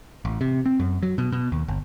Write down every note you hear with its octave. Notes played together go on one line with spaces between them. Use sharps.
A1
C3
C4
F#2
F#3
B2
B2
D#2
G1